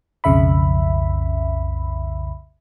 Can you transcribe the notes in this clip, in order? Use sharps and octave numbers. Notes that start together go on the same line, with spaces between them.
B1 F2 C#3 E5 B5